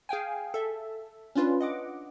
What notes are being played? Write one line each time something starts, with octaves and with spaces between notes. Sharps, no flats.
G#4 F5 G5 G#5
A4 E5
C#4 D4 F4 B4
D#5 F#5 D6